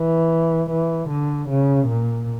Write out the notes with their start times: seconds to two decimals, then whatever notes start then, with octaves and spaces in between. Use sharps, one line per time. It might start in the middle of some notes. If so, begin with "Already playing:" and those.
Already playing: E3
0.71 E3
1.10 D3
1.50 C#3
1.88 A#2